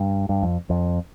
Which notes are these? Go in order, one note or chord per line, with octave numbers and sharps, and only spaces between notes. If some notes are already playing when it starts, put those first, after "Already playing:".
Already playing: G2
G2
F2
F2